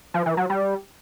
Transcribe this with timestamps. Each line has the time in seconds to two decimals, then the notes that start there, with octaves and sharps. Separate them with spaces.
0.14 F3
0.26 E3
0.37 F#3
0.50 G3